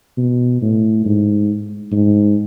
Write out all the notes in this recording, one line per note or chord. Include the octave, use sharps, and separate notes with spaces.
B2
A2
G#2
G#2